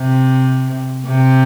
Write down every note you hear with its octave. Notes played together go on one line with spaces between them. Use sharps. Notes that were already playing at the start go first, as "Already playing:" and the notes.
Already playing: C3
C3